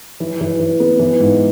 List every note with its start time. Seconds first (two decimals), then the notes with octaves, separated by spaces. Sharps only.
0.20 E3
0.41 E3
0.60 E3
0.80 B3
1.00 E3
1.20 G#2